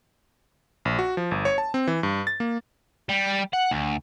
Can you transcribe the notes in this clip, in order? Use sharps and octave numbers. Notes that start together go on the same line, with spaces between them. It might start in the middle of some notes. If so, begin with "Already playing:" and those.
A#1
F#4
F3
G1
C#5
A5
C4
E3
G2
A6
A#3
G3
F#5
D2